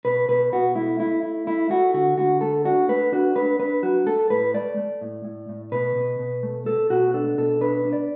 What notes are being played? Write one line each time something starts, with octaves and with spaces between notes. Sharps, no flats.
B2 B4
B2 B4
B2 F#4
A3 E4
A3 E4
E4
A3 E4
A3 F#4
D3 F#4
D3 F#4
A3 A4
D4 F#4
A3 B4
D4 F#4
D4 B4
D4 B4
F#3 F#4
A3 A4
A2 B4
A3 D5
A3
A2
A2
A2
B2 B4
B2
B2
A3
A3 A4
B2 F#4
D4 A4
B2 A4
D4 B4
D4
D5